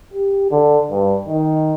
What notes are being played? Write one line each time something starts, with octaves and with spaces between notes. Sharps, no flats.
G4
D3
G2
D#3